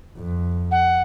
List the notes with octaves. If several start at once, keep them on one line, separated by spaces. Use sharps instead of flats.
F2
F#5